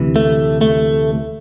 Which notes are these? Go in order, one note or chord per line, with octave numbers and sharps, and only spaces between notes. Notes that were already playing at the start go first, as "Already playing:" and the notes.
Already playing: D2 C3 E3
A3
A3